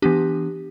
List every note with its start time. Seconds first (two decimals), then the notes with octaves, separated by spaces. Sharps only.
0.02 E3 B3 D4 G4